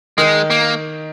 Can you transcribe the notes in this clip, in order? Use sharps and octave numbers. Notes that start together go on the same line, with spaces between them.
D#3 G#3 D#4
A#3